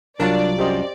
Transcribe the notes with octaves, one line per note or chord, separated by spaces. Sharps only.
C2 F#3 D4 F4 A#4 D5 A5
F#2 G4 C5 D#5